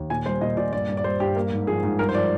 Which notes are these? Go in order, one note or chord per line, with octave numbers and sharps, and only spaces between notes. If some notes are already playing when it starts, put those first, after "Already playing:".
Already playing: D#2
A#2 G#5
G3 C5
A#2 D#5
A#2 D5
G2 D5
G2
D5
G3 C5
G2 G4
A#3
G#2
F3 G#4
G#2
G2 A#4
C5
F3 D5